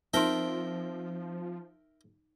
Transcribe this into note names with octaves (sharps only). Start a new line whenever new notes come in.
F3 C4 D#4 F4 A#4 E5 G5 C6